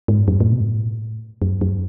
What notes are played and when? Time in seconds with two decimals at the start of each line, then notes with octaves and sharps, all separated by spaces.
0.08 G#2
0.28 F#2
0.40 A2
0.52 B2
0.60 G#2
0.66 A2
1.42 F#2
1.61 F#2